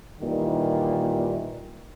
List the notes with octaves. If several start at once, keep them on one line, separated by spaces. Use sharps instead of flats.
A#2 D#3 E3 G3